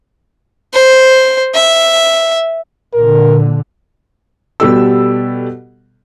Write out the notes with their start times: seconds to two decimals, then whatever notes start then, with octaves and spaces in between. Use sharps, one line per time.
0.73 C5
1.55 E5
2.94 A#2 D3 A#4
4.60 B2 G3 B3 G4 A4 E6